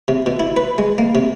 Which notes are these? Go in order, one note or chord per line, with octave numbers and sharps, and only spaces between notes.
C3
B2
E4
B4
G#3
A#3
C3